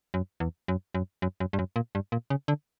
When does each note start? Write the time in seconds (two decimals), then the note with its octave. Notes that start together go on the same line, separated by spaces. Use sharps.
0.14 F#2
0.40 E2
0.68 F#2
0.95 F#2
1.22 F#2
1.40 F#2
1.53 G2
1.59 F#2
1.76 A#2
1.95 G2
2.12 A#2
2.30 C#3
2.48 D3